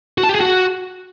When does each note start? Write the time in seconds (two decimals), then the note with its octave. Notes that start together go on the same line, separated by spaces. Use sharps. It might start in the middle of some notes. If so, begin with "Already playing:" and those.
0.18 F#4
0.23 A5
0.29 G4
0.35 G#4
0.41 F#4